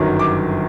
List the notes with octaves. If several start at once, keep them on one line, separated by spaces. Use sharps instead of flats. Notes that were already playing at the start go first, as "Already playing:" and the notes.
Already playing: G1 F#2 D#3 F#3
D6